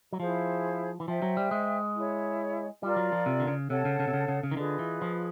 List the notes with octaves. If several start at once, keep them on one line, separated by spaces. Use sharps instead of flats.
F#3
F3 E4 G#4 C5 F5
E3
F3 C5 E5 G5
F#3
G3
G#3
E4 G#4 C#5
G3 F4 A#4 D5
F#3
F3
C3
D3
C#3
C3 A4 C#5 F#5 A5
C#3
C#3
C3
C#3
C#3
C#3
D#3
D3 F4 G#4 B4 D#5
E3
F3